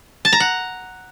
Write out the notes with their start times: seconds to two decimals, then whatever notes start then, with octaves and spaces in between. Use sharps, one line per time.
0.25 A5
0.33 A#5
0.40 F#5